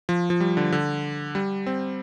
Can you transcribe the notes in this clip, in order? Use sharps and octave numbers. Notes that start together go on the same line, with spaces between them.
F3
F3
G3
D3
D3
G3
C4